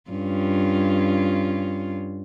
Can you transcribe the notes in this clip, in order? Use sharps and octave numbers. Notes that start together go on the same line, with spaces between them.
G2 C#4 F4